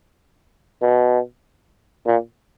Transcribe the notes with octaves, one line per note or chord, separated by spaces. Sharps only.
B2
A#2